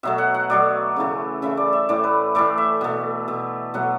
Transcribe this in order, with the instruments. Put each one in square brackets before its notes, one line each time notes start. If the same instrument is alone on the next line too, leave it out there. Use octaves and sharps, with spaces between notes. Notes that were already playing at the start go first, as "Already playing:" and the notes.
[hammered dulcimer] B2 F#3 A3 E5
F#5
F#5
B2 F#3 A3 D5
C#3 E3 A3
C#3 E3 A3 E5
D5
E5
A2 E3 A3 D5
B4
A2 E3 A3 D5
E5
B2 A3
B2 A3
B2 F#3 A3 F#5